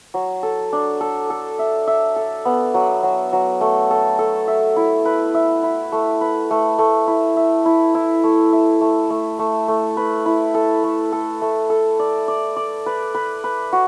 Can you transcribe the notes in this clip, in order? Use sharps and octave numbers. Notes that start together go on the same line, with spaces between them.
F#3
A4
D4
A4
A4
E5
E5
A4
B3
F#3
F#3
F#3
A3
A4
A4
E5
E4
B4
E5
E4
A3
B4
A3
A3
E4
E5
E4
E4
A3
E5
A3
A3
A3
A3
B4
E4
A4
A3
A4
A3
A4
D5
D5
D5
B4
B4
B4
F#4